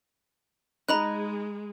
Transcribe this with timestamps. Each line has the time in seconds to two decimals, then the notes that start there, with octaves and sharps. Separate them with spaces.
0.89 G#3 D#4 D#5 A#5 B5 F#6